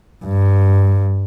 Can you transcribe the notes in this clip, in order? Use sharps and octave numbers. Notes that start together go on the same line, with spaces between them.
G2